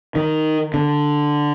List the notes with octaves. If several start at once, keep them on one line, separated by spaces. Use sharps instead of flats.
D#3
D3